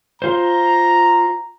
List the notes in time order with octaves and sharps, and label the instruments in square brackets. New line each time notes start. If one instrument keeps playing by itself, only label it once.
[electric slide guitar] F4 C5 [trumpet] A#5